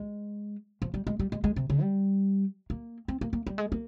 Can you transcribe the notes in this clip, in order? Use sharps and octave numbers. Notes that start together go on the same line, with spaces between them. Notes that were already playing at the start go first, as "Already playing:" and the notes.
Already playing: G#3
F3
G3
G#3
G3
G#3
G#3
C3
C#3
G3
A#3
C4
A#3
A#3
G3
G#3
A#3